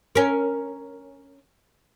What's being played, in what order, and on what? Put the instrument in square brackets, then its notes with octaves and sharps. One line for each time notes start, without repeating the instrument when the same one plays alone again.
[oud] C#4 A#4